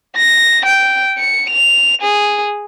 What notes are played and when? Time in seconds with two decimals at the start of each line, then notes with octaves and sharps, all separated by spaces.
0.16 A#6
0.66 G5
1.18 C#7
1.50 F7
2.02 G#4